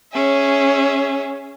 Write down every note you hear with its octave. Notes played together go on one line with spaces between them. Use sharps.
C#4 G#4 E5